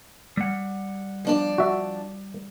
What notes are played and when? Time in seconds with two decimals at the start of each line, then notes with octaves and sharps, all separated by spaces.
0.37 G3 F#5
1.25 F3 D4 D5
1.58 F#4 E5